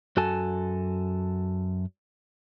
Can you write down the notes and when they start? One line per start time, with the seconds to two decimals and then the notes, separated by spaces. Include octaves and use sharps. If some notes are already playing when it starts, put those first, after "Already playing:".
0.17 F#2 F#4 A4 G#5 A5